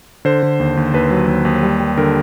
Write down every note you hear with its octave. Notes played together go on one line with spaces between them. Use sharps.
D3 C5
D3
D#2
D#2
D#2 B4
F#3
D#2
D#2
G3
G3
D3 A#4